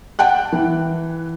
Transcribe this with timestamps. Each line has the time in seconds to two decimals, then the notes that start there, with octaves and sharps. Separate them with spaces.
0.19 F#5 G5 A5 F#6
0.52 E3